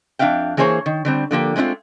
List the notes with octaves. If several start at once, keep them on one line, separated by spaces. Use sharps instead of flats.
F2 D4 E5 F5 G5
E3 A#3 G#4 C5 C#5 A5
D#3
D3 G3 C4
D3 F3 A#3 G4
G#3 A3 C4 D#4 F4